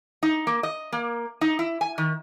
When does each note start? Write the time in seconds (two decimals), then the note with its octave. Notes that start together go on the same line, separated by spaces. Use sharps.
0.23 D#4
0.47 A#3
0.63 D#5
0.93 A#3
1.41 D#4
1.59 E4
1.81 G#5
1.98 D#3